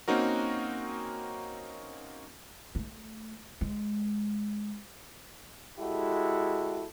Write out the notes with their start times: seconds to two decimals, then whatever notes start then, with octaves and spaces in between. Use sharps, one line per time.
0.08 A#3 C4 C#4 D#4 F#4 A#4
2.75 A3
3.61 G#3
5.79 G#3 E4 F#4 G4 A4